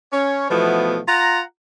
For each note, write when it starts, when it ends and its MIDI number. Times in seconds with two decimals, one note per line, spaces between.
0.12 0.47 61
0.12 0.47 73
0.50 0.99 47
0.50 0.99 52
0.50 0.99 53
0.50 0.99 57
0.50 0.99 59
1.08 1.41 65
1.08 1.41 78
1.08 1.41 82